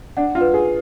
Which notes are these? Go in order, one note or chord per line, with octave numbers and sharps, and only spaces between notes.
D4 F#5
F4
B4
G#4